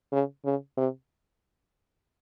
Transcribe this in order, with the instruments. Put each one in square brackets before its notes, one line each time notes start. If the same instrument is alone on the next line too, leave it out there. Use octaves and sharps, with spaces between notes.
[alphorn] C#3
C#3
C3